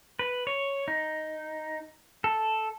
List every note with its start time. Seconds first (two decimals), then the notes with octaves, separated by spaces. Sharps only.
0.19 B4
0.47 C#5
0.88 D#4
2.24 A4